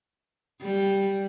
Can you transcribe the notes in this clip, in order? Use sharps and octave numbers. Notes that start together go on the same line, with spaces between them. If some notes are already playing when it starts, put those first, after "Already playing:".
G3